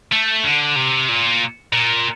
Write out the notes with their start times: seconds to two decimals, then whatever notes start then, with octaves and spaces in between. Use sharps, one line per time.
0.12 A3
0.44 D3
0.76 C3
1.09 A#2
1.73 A#2